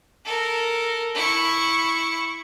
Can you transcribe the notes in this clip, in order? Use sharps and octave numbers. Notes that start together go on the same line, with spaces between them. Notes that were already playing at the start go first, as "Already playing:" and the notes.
A4 A#4
E4 C#6